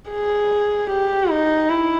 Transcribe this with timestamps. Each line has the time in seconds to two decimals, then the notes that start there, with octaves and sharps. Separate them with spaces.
0.10 G#4
0.90 G4
1.30 D#4
1.70 E4